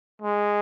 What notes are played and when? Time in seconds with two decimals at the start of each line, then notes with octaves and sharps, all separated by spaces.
0.22 G#3